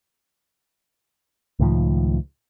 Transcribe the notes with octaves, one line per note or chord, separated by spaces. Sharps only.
C#2 A2 D#3 F3